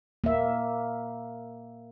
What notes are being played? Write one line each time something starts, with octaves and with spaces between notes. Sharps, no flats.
A#3 E5